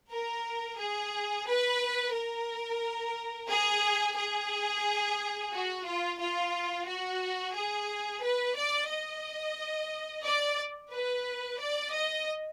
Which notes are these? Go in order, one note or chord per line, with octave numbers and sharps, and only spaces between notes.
A#4
G#4
B4
A#4
G#4
G#4
F#4
F4
F4
F#4
G#4
B4
D5
D#5
D5
B4
D5
D#5